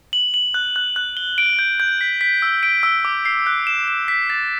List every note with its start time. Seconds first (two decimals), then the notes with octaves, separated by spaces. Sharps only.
0.13 F#7
0.34 F#7
0.54 F#6
0.76 F#6
0.96 F#6
1.17 G7
1.38 D7
1.59 G6
1.80 G6
2.01 B6
2.21 B6
2.42 E6
2.63 D7
2.83 E6
3.05 D6
3.25 C7
3.47 F#6
3.67 E7
3.88 E7
4.08 B6
4.30 A6